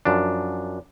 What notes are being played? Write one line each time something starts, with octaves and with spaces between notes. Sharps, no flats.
F#2 F3 D4